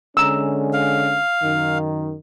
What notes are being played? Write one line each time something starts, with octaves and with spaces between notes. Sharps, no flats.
D3 G#3 C#4 A#5 E6
F5
F#2 D#3